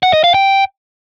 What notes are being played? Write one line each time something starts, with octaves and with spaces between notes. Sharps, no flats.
F#5
D#5
F5
G5